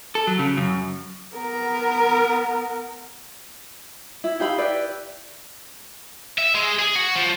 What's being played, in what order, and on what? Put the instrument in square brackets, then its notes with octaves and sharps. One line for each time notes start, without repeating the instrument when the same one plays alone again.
[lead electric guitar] A4
F#3
C#3
F#2
[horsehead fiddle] B3 A#4
[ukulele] E4
D#4 G4 F5 B5
E4 G4 B4 D5
[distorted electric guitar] E5
G#3
G#4
F#4
F3